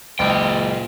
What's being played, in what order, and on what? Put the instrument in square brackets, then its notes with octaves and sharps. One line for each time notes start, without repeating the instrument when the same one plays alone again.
[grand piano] F#1 C#2 [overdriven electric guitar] A#2 G5